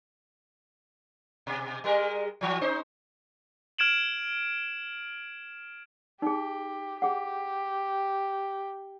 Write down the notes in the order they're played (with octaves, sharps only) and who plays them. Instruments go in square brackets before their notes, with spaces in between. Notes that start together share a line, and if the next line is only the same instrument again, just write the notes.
[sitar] B2
G3 G#3 A#4
E3 F#3
C#4 D#4 C5
[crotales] F6 G#6 D7 E7 F#7
[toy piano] D#4 G#4 [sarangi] G4
[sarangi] G4 [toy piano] G#4 F#5